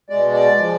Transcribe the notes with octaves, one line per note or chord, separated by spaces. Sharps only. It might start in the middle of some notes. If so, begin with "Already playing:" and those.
B2 G#3 D5
D5
F3 G#3